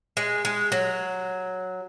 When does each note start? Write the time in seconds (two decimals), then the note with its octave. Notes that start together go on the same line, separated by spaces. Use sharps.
0.17 G#3
0.45 G#3
0.72 F#3